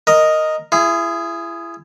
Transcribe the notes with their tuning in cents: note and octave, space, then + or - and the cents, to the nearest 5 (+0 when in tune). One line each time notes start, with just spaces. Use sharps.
A#4 +0 D#5 +0
E4 +35 G#4 +0